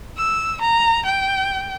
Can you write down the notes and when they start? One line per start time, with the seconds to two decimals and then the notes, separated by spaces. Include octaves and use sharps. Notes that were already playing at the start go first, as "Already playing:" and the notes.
0.17 E6
0.61 A#5
1.06 G5